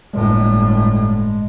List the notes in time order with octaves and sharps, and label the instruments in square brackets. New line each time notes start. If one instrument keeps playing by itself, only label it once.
[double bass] G1 A2 [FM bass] G#3